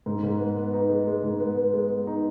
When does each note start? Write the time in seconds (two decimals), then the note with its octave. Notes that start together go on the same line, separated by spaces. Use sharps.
0.06 G#2
0.23 G#2
0.40 B3
0.57 B3
0.74 D#4
0.90 G#3
1.07 G#3
1.24 G#2
1.40 B3
1.57 B3
1.74 G#3
1.90 B3
2.07 D#4